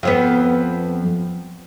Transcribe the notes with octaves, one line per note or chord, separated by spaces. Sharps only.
F2 F3 B3